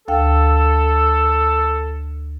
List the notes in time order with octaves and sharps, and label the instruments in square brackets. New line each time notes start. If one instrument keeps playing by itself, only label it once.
[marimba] D2 F5 G5 [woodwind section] A4